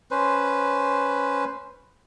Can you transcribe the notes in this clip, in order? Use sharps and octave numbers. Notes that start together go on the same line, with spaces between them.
C#4 B4 C5